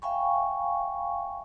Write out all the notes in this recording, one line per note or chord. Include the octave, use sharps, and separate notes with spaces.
E5 F5 G5 G#5 B5 C#6